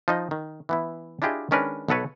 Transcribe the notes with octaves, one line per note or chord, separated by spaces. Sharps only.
F3 D#4 D#5
D#3
E3 B3 E4
D4 E4 F4 G4 G#4 D#5
D#3 G#3 C#4 D4 A#4 B4
B1 B3 A4 B4 C#5